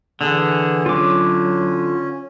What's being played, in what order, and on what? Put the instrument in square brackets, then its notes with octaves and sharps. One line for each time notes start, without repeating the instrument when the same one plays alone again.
[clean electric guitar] D3 [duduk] E3 [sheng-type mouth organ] G#4 F#5
[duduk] F#3 [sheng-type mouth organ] C#4 [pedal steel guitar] F4 D6